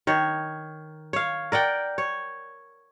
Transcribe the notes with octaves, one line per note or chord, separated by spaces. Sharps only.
D#3 C#5
C#5 F5
A#4 D5 F#5 G5
C#5